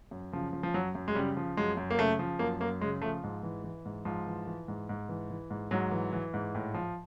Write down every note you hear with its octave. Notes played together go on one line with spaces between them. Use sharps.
F#2
C#3 F3
F3
F3
F#2 F#3
F#2
G#3
C#3 G3
F3
F#2 G#3
F#2
A#3
C#3 A3
F3
F#2 A#3
F#2 A#3
C#3 G#3
F3 A3
G#2
E3
E3
G#2
G#2 F3
E3
E3
G#2
G#2
E3
E3
G#2
G#2 F#3
E3
E3
G#2
A2
F3